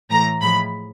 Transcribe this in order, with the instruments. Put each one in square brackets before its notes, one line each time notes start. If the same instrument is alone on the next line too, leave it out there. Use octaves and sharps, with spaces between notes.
[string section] A2 E3 A3 A#5
A2 F3 G#3 B5